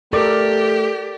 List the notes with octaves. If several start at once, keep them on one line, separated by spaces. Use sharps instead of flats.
A3 G4 A4 A#4 D5